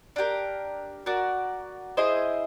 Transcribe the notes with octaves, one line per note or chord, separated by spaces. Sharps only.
D4 G4 A#4
F#4 A#4 D5
E4 G#4 C5 D#5